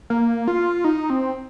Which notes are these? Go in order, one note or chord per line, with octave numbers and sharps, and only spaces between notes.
A#3
F4
D#4
C4